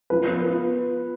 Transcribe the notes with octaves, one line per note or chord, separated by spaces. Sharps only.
F3 B4
B3
F4